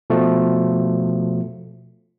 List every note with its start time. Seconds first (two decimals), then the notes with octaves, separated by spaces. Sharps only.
0.10 B2 F3 A3